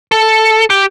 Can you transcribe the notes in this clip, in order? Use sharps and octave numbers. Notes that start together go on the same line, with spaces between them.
A4
G4